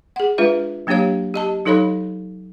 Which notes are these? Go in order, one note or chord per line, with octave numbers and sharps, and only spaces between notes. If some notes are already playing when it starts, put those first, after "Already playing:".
G#4 F#5
G#3 D4 F4 B4 E5
F#3 A#3 D4 G4 C#5 F5
G4 D#5 A5
F#3 D#4 A4 C#5 F5 B5